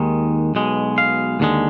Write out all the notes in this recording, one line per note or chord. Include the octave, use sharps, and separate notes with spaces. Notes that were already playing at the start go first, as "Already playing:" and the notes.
Already playing: D#2 D#3 G#3
B1 B2 G#3
F5
D#2 D3 G#3